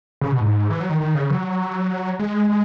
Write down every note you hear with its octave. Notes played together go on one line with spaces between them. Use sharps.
C#3
B2
G#2
E3
F#3
D#3
D#3
C#3
F#3
G#3
G#3